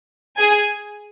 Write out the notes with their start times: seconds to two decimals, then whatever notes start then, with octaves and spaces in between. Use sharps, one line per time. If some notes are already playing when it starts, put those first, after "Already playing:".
0.37 G#4 G#5